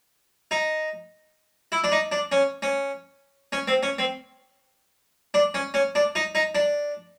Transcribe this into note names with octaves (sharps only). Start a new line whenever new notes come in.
D#4
E4
D4
D#4
D4
C#4
C#4
C#4
C4
C#4
C4
D4
C#4
C#4
D4
D#4
D#4
D4